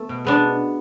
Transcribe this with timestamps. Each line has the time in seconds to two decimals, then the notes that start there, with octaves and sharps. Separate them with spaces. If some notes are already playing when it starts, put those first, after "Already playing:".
Already playing: A3 B3
0.09 B2
0.25 G#3 B3 D4